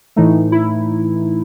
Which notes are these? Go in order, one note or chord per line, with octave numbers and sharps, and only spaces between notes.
A2 E3 A3 D#4
E4